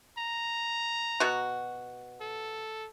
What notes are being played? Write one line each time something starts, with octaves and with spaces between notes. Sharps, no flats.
A#5
B2 F#4
A4